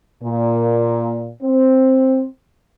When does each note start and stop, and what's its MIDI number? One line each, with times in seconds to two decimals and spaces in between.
0.23 1.29 46
1.43 2.26 60